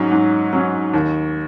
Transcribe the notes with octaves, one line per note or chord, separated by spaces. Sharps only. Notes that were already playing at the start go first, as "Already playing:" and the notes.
Already playing: G#2 F#3 C#4
G#2
F#3 C#4
D#2